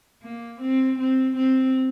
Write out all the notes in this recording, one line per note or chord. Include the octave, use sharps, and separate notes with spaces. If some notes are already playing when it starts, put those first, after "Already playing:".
A#3
C4
C4
C4